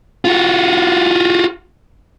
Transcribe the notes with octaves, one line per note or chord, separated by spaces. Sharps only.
F4 F#4